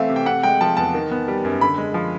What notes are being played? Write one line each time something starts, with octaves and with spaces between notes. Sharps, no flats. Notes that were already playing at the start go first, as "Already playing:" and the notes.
Already playing: E3 A3 C4 E5 F5
C3
G5
C3 F#5
G#3 G5
F3 A5
E2 A5
D#3
B3
G3
F#2
D3 B5
G#3
F3